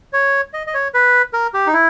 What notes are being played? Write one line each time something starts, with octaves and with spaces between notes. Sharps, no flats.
C#5
D#5
D#5
C#5
B4
A#4
G4
D#4
E4